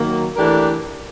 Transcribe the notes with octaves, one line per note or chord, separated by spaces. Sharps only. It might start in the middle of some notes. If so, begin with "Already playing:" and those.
Already playing: D#3 F#3 A#3
E3 A3 D4 G4 A#4